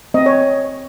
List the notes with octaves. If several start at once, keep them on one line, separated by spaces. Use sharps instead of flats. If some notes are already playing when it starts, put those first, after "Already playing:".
C4 D#5
C#5